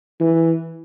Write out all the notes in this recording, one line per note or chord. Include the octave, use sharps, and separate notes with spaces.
E3